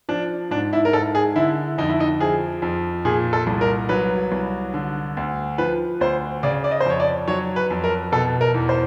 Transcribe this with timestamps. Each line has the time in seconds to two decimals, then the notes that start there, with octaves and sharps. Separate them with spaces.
0.09 F3 D4
0.51 G#2 D4
0.73 E4
0.85 A#4
0.93 G#2 A4
1.15 G#4
1.36 D3 E4
1.78 F2 D#4
1.89 E4
2.00 D#4
2.20 F3 G#4
2.62 F2
3.05 A#2 G#4
3.33 A4
3.47 C2
3.61 A#4
3.89 F#3 B4
4.32 C2
4.74 D3
5.17 D2
5.58 F3 B4
6.01 D2 C5
6.43 C#3 D5
6.64 D5
6.71 D#5
6.80 C5
6.86 F2 C#5
7.00 D5
7.28 F#3 C#5
7.56 B4
7.70 F2
7.84 A#4
8.12 B2 A4
8.41 A#4
8.54 E2
8.69 C5